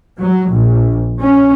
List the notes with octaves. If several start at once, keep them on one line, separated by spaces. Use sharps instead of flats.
F#3
A#1
C#4